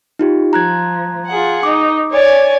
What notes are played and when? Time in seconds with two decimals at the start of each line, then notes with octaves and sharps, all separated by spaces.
0.19 D#4 F4 G4
0.53 F3 A#5 F#6 G#6
1.27 F4 G#4 F#5
1.63 D#4 D6
2.11 C#5 D5 G#5